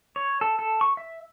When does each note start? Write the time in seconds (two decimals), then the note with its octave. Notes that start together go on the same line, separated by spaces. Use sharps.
0.16 C#5
0.41 A4
0.59 A4
0.81 C#6
0.97 E5